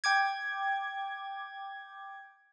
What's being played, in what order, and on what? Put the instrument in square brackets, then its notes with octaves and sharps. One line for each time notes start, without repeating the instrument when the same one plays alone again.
[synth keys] G5 D6 G#6